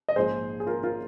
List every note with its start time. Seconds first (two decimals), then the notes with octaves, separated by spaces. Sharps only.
0.09 D#5
0.16 A#1 G#2 F3 G#4 C5
0.60 G#4
0.67 F4 A#4
0.83 F4 A#4